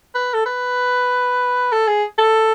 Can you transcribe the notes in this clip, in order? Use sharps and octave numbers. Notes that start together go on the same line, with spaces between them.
B4
A4
B4
A4
G#4
A4